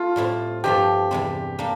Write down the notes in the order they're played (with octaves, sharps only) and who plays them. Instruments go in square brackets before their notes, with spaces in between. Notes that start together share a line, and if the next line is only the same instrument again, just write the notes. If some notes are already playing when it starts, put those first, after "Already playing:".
Already playing: [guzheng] A3 [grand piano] F4
[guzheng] A2 G3 C4 E4
[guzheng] G2 F3 A3 [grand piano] G4
[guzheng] E2 C3 G3 C4
G3 A#3 D4